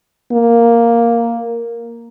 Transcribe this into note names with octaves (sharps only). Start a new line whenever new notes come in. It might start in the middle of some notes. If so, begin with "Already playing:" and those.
A#3